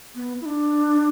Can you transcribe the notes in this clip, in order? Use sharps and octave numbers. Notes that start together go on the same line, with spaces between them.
B3
E4
D4